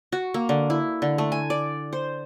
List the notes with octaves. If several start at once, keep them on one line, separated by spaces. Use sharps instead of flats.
F#4
A#3
D3
E4
D3
A3
G#5
D5
C5